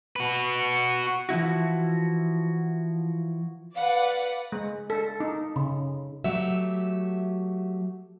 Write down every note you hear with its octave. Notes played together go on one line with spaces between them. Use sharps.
F#4 B4
E3 F3 E4 F#4
B4 D5 F5 F#5
G#3
A4
D#4
C#3
F#3 A3 G4 E5